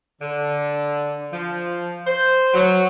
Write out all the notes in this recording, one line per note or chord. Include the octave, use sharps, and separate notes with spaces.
D3
F3
C5
F#3